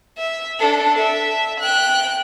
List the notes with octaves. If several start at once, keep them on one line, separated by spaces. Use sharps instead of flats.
E5
D4 A4
E5
G5 F#6